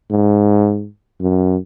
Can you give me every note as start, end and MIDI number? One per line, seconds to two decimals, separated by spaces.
0.11 0.87 44
1.20 1.57 42